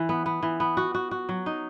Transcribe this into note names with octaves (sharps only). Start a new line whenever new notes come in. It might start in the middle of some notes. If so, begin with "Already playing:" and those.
Already playing: E3
B3
B3
E3
B3
F#4
F#4
F#4
F#3
D#4